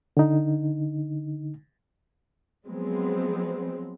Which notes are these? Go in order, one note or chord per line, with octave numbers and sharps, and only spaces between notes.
D3 D#4
F3 F#3 G#3 B3 C4